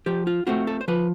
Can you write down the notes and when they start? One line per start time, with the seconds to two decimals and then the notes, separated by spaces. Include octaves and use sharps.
0.06 F3 G4
0.27 F4
0.47 A3 C4 F4 F#4
0.67 A4
0.81 C5
0.88 F3 B4